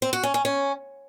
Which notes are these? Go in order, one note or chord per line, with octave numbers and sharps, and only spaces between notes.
C4
F#4
C#4
C#4
C#4